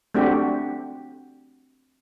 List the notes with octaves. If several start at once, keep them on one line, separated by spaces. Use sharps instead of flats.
A3 C4 D4 F#4 G4